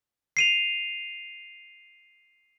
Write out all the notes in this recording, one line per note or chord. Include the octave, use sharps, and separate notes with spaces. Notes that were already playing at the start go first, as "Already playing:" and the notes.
C7 D#7 F7